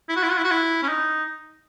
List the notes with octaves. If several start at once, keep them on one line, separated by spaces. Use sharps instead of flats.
E4
F#4
E4
F#4
E4
F#4
E4
C#4
D#4